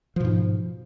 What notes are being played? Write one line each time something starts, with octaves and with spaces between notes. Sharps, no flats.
G#2 B2 F3